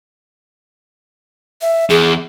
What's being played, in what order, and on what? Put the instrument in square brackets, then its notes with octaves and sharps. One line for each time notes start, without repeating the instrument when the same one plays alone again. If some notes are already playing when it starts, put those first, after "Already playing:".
[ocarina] E5
[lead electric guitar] E2 [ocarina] G#4